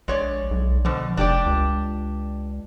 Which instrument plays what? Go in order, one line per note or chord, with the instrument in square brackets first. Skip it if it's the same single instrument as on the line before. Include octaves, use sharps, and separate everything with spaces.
[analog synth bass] A#1 [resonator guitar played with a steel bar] G#3 C#5 D5
[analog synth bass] B1
[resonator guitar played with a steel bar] B2 D3 [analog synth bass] F3
[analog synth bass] F1 [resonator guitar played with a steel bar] D4 G4 D5
[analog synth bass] C#2